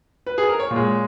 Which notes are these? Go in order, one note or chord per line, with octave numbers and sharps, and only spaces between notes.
B4
G#4
A#4
C#5
A#2
G#3